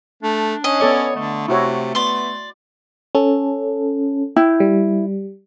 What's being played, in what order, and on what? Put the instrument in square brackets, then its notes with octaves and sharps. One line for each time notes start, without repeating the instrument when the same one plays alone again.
[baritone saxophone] A3 [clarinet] D4
[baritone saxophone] C#4 [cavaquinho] D#5
[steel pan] B3 A4 D5 [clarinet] C#5
[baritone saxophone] D3 [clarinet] A3
[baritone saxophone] C3 [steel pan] E4 F#4 C#5
[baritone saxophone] B3 [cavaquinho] D5 C6
[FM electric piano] C#4 A4
[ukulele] E4 [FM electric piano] G5
[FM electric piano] G3